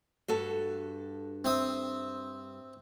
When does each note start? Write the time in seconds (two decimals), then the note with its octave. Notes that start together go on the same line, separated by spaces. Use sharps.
0.28 G2 F#4 A4
1.44 C4 E5 D#6